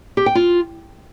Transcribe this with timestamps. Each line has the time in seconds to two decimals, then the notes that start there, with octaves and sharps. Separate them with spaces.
0.17 G4
0.26 G5
0.35 F4